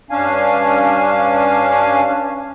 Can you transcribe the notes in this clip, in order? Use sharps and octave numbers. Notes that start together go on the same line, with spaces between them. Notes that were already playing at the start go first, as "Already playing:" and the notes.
G2 C#4 D4 F5 G#5